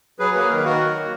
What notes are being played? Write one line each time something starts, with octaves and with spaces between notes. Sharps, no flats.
F#3 G#4 B4
A#3 G#4 B4
D#3 A#4
B4
D#3 F#4 A#4
F#3
A#3